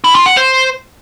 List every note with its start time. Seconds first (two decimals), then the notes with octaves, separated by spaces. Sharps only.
0.04 E4
0.15 F4
0.26 F#5
0.37 C5